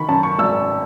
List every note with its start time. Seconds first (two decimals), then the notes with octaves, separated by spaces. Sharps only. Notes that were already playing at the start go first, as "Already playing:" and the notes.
Already playing: D#3 B5 C#6
0.09 F#2 A5
0.23 C#6
0.39 G#1 E6